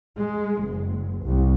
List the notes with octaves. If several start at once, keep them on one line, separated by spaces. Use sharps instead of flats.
G#3
F#1
C2